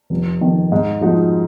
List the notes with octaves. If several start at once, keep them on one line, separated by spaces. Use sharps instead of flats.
F1
F2 D#3
G#2
F3 G#3 D#4 F#4